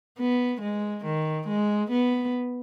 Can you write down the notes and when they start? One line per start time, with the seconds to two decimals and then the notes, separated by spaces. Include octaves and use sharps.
0.18 B3
0.61 G#3
1.05 D#3
1.48 G#3
1.91 B3